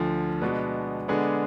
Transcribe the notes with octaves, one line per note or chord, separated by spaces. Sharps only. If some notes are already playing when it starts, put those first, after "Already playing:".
Already playing: D2 D3 F3
B2 G#3 B3 D4
D3 G#3 B3 D4 G#4